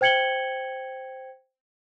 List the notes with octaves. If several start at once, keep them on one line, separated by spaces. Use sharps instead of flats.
C5 G5 G#6 C#7 F#7 G7